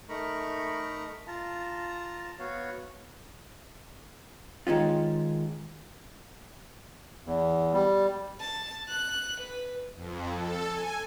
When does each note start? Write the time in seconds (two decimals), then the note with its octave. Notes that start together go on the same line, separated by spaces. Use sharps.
0.09 A3 D#4 A#4 A#5 B5 C#6
1.27 F4 A5 A#5
2.39 B3 F#4 C#5 F5
4.67 D#3 G#3 C#4 F4
7.26 E2
7.73 G3
8.40 A5
8.88 F#6
9.40 B4
9.95 F2
10.34 A4
10.70 G#5